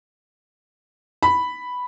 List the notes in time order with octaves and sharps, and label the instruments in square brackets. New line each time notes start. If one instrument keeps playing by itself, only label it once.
[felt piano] B5